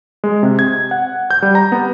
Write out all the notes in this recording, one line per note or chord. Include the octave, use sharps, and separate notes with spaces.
G#3
C3
G#6
F#5
G6
G3
A#5
B3